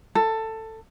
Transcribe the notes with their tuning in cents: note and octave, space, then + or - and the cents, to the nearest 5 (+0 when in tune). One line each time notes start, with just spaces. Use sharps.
A4 +15